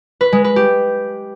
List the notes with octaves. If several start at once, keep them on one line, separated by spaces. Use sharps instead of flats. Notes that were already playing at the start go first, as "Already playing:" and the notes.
B4
G#3
B4
G4